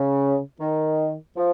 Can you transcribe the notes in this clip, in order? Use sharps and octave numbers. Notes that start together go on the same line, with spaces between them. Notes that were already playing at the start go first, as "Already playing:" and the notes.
Already playing: C#3
D#3
F3